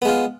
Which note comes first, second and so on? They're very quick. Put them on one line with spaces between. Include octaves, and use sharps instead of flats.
B3 G#3 F4